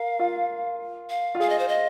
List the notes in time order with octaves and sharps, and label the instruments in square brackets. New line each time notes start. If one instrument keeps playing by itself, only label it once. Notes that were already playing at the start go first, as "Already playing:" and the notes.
Already playing: [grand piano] A#4 [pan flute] F5
[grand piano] F4
[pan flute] F5
[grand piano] F4
[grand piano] G#4 [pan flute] F5
[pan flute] D#5
C5
D#5